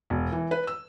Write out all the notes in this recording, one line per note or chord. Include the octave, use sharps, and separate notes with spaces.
E1
E3
B4
E6